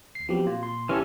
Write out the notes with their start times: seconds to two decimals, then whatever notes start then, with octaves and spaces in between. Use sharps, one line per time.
0.15 D2 C7
0.29 F3 F#3 B3 C4 G4
0.47 A#2 F4
0.63 C6
0.89 G#1 E3 C#4 G4 A4 F6